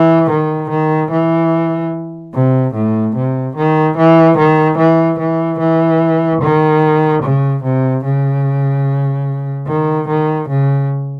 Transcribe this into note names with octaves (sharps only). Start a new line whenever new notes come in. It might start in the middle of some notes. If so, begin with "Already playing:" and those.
Already playing: E3
D#3
D#3
E3
C3
A2
C3
D#3
E3
D#3
E3
E3
E3
D#3
C#3
C3
C#3
D#3
D#3
C#3